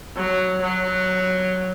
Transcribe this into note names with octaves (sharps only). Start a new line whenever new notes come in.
F#3
F#3